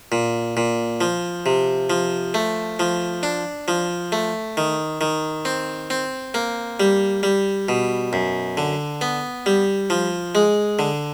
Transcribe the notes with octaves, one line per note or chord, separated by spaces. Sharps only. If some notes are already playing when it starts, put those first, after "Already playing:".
A#2
A#2
F3
C3
F3
A3
F3
D4
F3
A3
D#3
D#3
C4
C4
A#3
G3
G3
B2
F#2
D3
B3
G3
F3
G#3
D3